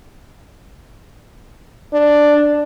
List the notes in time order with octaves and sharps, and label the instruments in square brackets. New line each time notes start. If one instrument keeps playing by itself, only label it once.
[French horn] D4 [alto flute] D5